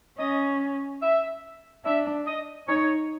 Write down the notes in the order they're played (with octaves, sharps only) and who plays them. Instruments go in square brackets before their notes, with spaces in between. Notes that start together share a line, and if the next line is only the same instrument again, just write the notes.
[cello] C#4 [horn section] D#5
[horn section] E5
[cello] D4 [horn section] E5
[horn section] D#5
[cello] D#4 [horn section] C#5